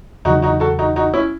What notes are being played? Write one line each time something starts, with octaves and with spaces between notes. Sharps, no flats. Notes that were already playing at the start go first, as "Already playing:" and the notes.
E2 C#3 F#3 D#4 F#4
D#4 F#4
F#4 A4
D#4 F#4
D#4 F#4
C#4 E4